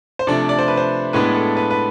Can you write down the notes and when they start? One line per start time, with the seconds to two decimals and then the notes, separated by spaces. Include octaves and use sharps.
0.19 C5
0.27 C3 F3 A3 D4 D5
0.49 D5
0.59 C5
0.68 B4
0.77 C5
1.13 A2 G#3 B3 D4 B4
1.35 A4
1.57 B4
1.71 B4